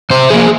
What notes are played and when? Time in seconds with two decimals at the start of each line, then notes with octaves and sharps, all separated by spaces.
0.10 C3 C5
0.30 F3 A#3 G#4